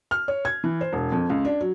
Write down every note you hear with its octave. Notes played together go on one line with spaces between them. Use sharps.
F6
C#5
G#6
E3
C5
E1
F2
C#2
D4
F#3